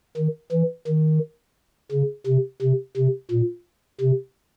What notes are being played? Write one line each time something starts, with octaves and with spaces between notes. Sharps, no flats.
D#3
E3
D#3
C#3
C3
C3
C3
A#2
C3